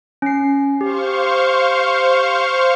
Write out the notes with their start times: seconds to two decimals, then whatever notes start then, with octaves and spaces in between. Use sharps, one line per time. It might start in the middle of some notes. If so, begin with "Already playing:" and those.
0.22 C#4 C7
0.81 G4 C5 F5 C#6